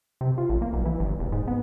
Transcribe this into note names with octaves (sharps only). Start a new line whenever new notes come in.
C3
F4
A1
A#3
B1
E3
G1
E1
G#2
B3